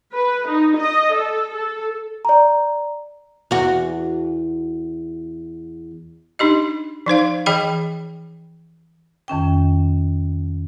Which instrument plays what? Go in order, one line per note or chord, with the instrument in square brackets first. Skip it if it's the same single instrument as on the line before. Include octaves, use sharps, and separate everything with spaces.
[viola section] B4
D#4
D#5
A4
A4
[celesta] D5 A#5
[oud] E2 F#4
[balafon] D4 D#4 G4 D#5
F3 D#4 C5 F5
E3 G#4 D#5 G5 B5
[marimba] F2 D#3 C#4 G5